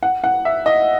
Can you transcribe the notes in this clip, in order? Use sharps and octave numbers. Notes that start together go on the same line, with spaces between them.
F#5
F#5
E5
D#5